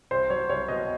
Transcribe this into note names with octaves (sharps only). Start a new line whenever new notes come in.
C2 C5
F#3 C#5
C2 C#5
B2 D#5